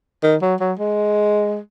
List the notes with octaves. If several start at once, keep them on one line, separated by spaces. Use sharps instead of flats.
D#3
F#3
F#3
G#3